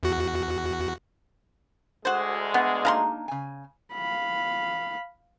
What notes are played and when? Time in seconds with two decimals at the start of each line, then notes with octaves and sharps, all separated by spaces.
0.03 E2 F#4
2.05 D2 G#3 F#4 C5
2.54 B3 D4 F#5
2.85 A#3 D4 D#4 F5 A#5 C6
3.28 C#3 G#5
3.93 F5 B5